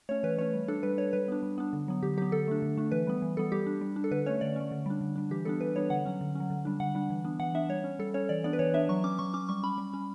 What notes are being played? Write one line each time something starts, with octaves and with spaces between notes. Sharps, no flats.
A3 C#4 C#5
E3 B4
A3 C#4 C#5
G3
D4 A4
G3 B4
D4 C#5
G3 B4
B3 D4
G3
B3 D4
D3
F#3 B3
D3 G4
F#3 B3 G4
D3 A4
A3 D4
D3
A3 D4
E3 B4
G3 B3
E3
G3 B3 A4
G3 G4
D4
G3
D4
A4
D3 B4
A3 C#4 C#5
D3 D5
A3 C#4
D3
G3 D4
D3
G3 D4
E3 G4
G3 B3 D4 A4
E3 B4
G3 B3 D4 C#5
D3 F#5
F#3 C#4
D3
F#3 C#4
D3
G3 D4
D3 F#5
G3 D4
E3
B3 D4
E3 F#5
B3 D4 E5
G3 C#5
C#4
G3 A4
C#4 C#5
E3 D5
B3 D4 D5
B4
E3 C#5
B3 D4 E5
F#3 C#6
C#4 D6
F#3 C#6
C#4 D6
G3 C#6
C#4 B5
G3
C#4